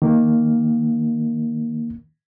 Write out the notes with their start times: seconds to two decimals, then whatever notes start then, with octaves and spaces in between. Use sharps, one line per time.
0.02 D#3 A#3